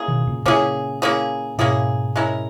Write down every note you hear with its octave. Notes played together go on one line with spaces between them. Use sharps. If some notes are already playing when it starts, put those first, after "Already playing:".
Already playing: A#3 C#4 E4 G#4
B2 D#3
A#2 C#3
A#2 C#3 A#3 C#4 E4 G#4
A#3 C#4 E4 G#4
G#2 B2 A#3 C#4 E4 G#4
G#3 C#4 E4 A#4